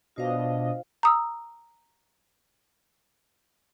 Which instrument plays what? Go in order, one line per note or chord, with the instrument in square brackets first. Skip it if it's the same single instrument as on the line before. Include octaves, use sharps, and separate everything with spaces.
[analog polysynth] B2 D4 D#5 [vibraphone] F4 C5 F5
[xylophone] A#5 D#6 E6